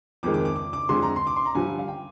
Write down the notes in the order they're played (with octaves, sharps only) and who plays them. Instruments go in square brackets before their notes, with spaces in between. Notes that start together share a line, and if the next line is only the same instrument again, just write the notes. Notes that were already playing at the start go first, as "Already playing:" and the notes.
[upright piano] F2 D#3 G#3 [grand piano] D6
[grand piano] D6
D6
D6
D6
[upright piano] F2 D3 G#3 [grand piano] C6
[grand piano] A#5
C6
D6
C6
A#5
[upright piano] G2 D3 F3 [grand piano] G#5
[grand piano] F5
G5